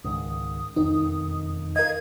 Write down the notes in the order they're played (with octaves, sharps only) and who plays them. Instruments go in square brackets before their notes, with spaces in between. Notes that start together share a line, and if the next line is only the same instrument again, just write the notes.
[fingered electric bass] C#2 G#2 D#3 [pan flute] D#6
[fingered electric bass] E1 F2 D#3 [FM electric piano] D#4
[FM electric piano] A#4 D#5 [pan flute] F5 [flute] G#6